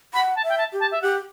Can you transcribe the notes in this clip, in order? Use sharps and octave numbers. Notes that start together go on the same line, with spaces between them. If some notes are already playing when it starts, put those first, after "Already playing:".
F#5 B5
A5
E5
G5
A5
G4
A5
E5
G4 F#5